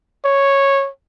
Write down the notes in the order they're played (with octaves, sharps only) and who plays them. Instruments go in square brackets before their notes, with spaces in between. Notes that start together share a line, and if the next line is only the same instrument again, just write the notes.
[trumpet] C#5